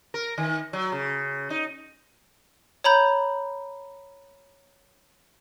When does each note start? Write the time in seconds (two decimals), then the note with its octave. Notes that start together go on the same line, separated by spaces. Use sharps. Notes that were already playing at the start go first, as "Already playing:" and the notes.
0.14 A#4
0.38 D#3
0.73 F#3
0.92 C#3
1.50 D#4
2.84 C#5 A#5 B5 G6